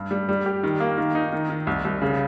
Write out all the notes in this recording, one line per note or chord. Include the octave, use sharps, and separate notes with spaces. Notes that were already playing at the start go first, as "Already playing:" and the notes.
Already playing: G2
G3
G3
G4
D#3
A#3
D#3
D#4
D#3
D#3
C2
C2
C#3